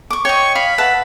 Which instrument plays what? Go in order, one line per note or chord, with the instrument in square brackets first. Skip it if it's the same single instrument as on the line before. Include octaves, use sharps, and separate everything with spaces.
[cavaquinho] C#6 D6
[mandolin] C#5 [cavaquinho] D#5 G5 [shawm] C#6
[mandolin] F5 [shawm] B5
[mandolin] B4 [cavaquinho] E5 F#5 A5